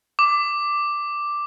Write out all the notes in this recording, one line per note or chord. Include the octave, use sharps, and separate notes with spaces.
D6